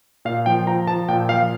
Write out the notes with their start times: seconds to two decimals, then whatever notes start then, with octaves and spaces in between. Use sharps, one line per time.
0.25 A#2 F5
0.46 F3 G5
0.67 F3 A#5
0.87 F3 A5
1.08 A#2 G5
1.29 F3 F5